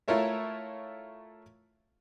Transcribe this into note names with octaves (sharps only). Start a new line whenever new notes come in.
A3 E4 F4 A#4 C#5 E5